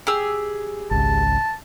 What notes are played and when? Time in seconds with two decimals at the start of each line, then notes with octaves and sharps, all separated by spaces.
0.07 G4 G#4 E6
0.91 G#1 C#2 A5